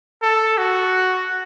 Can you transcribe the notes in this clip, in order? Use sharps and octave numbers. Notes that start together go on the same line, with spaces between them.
A4
F#4